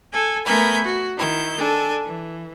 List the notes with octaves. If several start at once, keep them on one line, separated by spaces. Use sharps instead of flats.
A4 G#5
A3 B3 A#4 G#5 B5 G6
F#4
D#3 E4 G6
D4 A4 G#5
E3